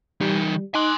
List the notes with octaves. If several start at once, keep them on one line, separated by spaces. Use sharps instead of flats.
E3 G3 D#4
D#4 G#5 C6 D6 F#6